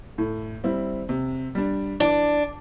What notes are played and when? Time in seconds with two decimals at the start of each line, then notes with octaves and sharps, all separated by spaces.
0.18 A2
0.64 G3 C4 E4
1.09 C3
1.55 G3 D4
2.00 E3 D4